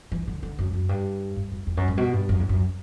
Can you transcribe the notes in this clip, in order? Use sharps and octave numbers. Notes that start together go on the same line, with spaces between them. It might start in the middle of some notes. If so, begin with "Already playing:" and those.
E3
D3
D3
F#2
F#2
G2
G2
F#2
E2
F#2
G2
B2
G2
F#2
E2
F#2